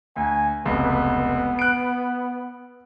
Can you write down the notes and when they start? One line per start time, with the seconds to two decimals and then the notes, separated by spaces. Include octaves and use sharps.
0.16 D2 G#5
0.65 F1 C#2 B3
1.59 F#6 D7